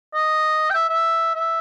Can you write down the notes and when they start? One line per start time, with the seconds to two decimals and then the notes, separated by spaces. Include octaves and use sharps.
0.14 D#5
0.70 G5
0.74 E5
0.89 E5
1.35 E5